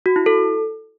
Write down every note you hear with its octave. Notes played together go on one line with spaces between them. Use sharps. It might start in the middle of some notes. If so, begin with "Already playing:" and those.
F#4
E4
A4